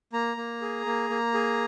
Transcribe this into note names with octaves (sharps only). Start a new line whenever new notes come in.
A#3 A#5
A#3
G#4
A#3
A#3
G#4